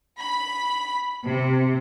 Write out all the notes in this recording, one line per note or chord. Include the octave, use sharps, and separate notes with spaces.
B5
C3